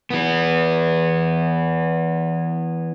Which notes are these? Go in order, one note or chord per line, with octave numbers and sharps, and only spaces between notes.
E3 B3